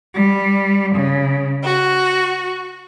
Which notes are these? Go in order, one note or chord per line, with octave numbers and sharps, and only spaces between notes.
G3
C#3
F#4